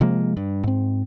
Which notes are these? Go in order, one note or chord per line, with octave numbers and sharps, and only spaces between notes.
C3 F3 G#3 A#3
G2
G#2 C4